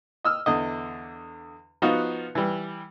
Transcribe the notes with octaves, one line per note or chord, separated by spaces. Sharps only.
D#5 E6 F6
E2 D3 D#5
F3 B3 D#4 F4 F#4
E3 G3